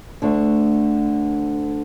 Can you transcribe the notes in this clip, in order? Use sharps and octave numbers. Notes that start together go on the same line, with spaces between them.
D2 D3 A3 D4